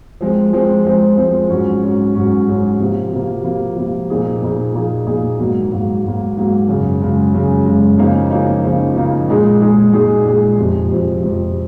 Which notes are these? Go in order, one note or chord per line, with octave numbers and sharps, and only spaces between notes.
F3 G#3 C4
F3 G#3 C4
F3 G#3 C4
F3 G#3 C4
G#2 F#3 C#4
G#2 F#3 C#4
G#2 F#3 C#4
G#2 F#3 C#4
C3 F3 A#3
C3 F3 A#3
C3 F3 A#3
C3 F3 A#3
A#2 F3 A#3 D#4 G#4
A#2 F3 A#3 D#4 G#4
A#2 F3 A#3 D#4 G#4
A#2 F3 A#3 D#4 G#4
G#2 F#3 A#3
G#2 F#3 A#3
G#2 F#3 A#3
G#2 F#3 A#3
F#2 C#3 G#3
F#2 C#3 G#3
F#2 C#3 G#3
F#2 C#3 G#3
C#3 F3 A#3 D#4
C#3 F3 A#3 D#4
C#3 F3 A#3 D#4
C#3 F3 A#3 D#4
A#2 G#3 D#4 G#4
A#2 G#3 D#4 G#4
A#2 G#3 D#4 G#4
A#2 G#3 D#4 G#4
F2 C3 F3
F2 C3 F3
F2 C3 F3